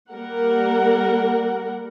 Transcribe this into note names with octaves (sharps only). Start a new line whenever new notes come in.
G3 A#3 A#4 F#5